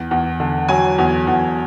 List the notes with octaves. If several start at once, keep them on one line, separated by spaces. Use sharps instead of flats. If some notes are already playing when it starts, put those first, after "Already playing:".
Already playing: E2
E2
D3
F#3 G#5
E2
E2